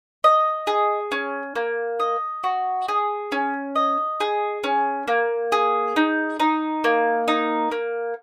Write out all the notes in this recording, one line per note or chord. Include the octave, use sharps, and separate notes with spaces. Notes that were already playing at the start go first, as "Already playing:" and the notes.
D#5
G#4
C#4
A#3
D#5
F#4
G#4
C#4
D#5
G#4
C#4
A#3
G#4
D#4
D#4
A#3
D#4
A#3